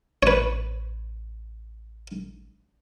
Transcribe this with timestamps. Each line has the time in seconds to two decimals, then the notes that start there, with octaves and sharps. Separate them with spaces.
0.23 A1 B4 C#5